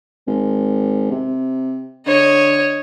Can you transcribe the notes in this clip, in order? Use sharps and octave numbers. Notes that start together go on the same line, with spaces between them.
G#1
C3
D3 C#5 D#5